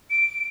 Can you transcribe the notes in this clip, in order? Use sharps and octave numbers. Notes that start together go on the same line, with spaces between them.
D7